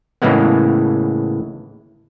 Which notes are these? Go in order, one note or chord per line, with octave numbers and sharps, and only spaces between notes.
A2 C#3 E3 G#3 A#3 B3